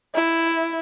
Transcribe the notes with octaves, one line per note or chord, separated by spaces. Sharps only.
E4